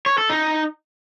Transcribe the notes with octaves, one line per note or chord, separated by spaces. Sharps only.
C#5
A4
D#4